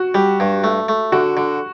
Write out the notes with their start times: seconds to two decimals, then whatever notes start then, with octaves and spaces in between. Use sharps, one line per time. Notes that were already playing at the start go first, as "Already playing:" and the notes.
Already playing: F#4
0.14 G3 G4
0.40 G2
0.64 A3
0.88 A3
1.12 D3 F#4
1.37 D3